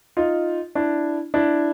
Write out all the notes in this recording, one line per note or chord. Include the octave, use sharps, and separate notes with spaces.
D#4 F4
D4 E4
D4 E4